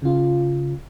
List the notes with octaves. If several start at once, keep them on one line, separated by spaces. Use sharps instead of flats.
C#3 F4